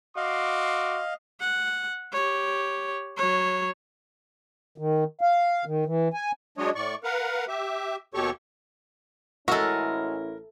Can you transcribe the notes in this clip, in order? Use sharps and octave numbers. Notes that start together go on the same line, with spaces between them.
F#4 D#5 F5 C6 D6
F#5
G4 C#5
F#3 C#5
D#3
F5
D#3
E3
G#5
F#3 G#3 D4 C#5 D#5
A2 D5 C#6
A#4 B4 F5 F#5
G4 E5
D#2 B2 G4 A4 C#5 C#6
A1 G#3 C#4 E4 F#4 A4 A#4 E5